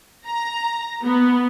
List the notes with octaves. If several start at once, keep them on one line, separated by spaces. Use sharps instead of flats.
A#5
B3